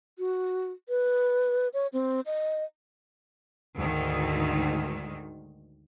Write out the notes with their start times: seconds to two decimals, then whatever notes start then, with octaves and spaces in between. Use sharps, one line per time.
0.19 F#4
0.89 B4
1.74 C#5
1.93 C4
2.26 D#5
3.76 D2 G#2 D#3